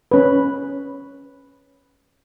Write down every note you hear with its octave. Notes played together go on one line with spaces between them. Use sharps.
C#4 B4